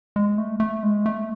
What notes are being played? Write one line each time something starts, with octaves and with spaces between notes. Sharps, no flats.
G#3
A3
A3
G#3
A3